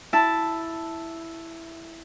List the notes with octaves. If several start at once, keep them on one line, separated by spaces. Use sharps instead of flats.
E4 A5